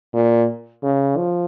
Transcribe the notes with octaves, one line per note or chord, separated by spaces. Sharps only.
A#2
C#3
F3